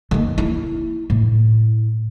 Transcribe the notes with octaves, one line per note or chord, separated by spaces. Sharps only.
D#3 A#3
E4
A2